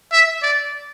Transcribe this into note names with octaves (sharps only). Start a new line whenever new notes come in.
E5
D5